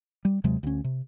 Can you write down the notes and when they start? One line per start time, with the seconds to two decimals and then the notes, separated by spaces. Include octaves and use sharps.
0.25 G3
0.44 D#2 C3 F#3 G#3
0.63 D2 C#4
0.84 C3